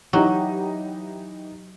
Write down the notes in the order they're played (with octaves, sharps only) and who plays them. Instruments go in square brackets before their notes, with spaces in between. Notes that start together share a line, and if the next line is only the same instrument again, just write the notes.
[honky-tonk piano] E3 D#4 G4 [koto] F#3